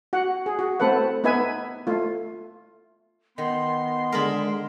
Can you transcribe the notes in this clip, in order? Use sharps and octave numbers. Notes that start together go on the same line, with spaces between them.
F#4 F#5
G#4
F#4
A3 C4 A4 B4 F#5
B3 D#4 B4 E5 G#5
A3 F4
D#3 B3 C6
D3 G#3 A#4 A5 B5